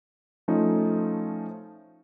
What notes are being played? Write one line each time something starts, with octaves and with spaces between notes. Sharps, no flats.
F3 A3 C#4 D#4